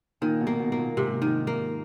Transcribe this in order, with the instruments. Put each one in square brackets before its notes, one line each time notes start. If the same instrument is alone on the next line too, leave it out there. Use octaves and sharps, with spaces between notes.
[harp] A#2 [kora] D#3
[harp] B2
[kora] A#3
[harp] B2
[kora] A#3
[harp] A#2
[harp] G#2 [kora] C3
[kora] D#3
A#3